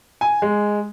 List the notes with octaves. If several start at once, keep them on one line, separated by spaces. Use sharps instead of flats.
G#5
G#3